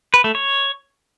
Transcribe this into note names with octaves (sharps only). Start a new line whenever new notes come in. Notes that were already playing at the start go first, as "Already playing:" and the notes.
B4
A3
C#5